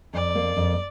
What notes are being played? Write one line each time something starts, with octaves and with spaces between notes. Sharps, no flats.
F2 D5
A#3
F2